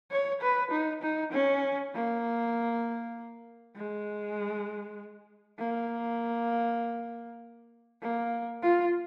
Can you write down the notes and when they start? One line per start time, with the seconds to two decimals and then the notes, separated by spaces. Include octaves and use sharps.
0.11 C#5
0.42 B4
0.72 D#4
1.02 D#4
1.32 C#4
1.94 A#3
3.76 G#3
5.59 A#3
8.02 A#3
8.63 F4